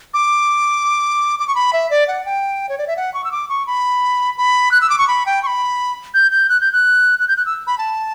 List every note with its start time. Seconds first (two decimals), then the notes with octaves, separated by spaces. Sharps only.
0.14 D6
1.39 D6
1.48 C#6
1.55 B5
1.73 E5
1.90 D5
2.08 F#5
2.26 G5
2.69 C#5
2.78 D5
2.88 E5
2.97 F#5
3.14 C#6
3.24 E6
3.32 D6
3.49 C#6
3.67 B5
4.38 B5
4.71 F#6
4.81 E6
4.90 D6
4.98 C#6
5.08 B5
5.26 G5
5.43 C#6
5.47 B5
6.14 G6
6.31 G6
6.49 F#6
6.61 G6
6.73 F#6
7.20 F#6
7.28 G6
7.37 F#6
7.46 E6
7.67 B5
7.78 A5